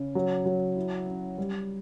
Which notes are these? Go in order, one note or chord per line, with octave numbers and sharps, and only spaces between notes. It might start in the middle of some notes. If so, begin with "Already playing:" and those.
Already playing: C#3
F#3
F#3
E4
C#4
G3